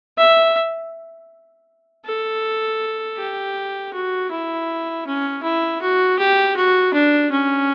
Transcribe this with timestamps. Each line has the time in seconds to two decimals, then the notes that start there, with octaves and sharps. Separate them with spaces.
0.18 E5
2.05 A4
3.18 G4
3.93 F#4
4.31 E4
5.07 C#4
5.43 E4
5.82 F#4
6.19 G4
6.56 F#4
6.94 D4
7.31 C#4